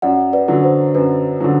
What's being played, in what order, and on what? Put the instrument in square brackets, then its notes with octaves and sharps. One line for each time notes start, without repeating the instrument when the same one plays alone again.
[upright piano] F#2 [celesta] D5 F#5
[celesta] B4 D5
[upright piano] D3 F#3
[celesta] C5
[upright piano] F#2 [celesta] B4
[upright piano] D3 F#3